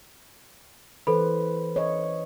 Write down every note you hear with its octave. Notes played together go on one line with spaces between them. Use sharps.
E3 A4 B4 C5 B5
C#5 D#5